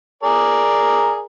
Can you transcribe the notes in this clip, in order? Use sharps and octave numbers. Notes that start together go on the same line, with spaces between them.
G#4 A#4 D5